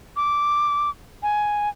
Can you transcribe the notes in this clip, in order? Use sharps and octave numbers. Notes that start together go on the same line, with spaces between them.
D6
G#5